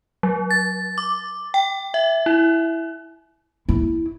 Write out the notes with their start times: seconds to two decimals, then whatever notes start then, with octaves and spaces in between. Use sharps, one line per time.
0.23 F#3
0.51 A6
0.98 D6
1.54 G5
1.94 E5
2.26 E4
3.69 E4